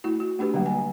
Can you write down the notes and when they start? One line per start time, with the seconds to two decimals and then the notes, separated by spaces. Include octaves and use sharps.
0.04 A3 E4 F#4
0.20 F#4
0.39 A3 D4 G4 B4
0.54 D3 F#3 G3 A#3
0.66 G#5